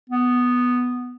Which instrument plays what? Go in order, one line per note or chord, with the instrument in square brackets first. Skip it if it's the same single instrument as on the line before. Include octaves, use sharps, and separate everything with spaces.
[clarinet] B3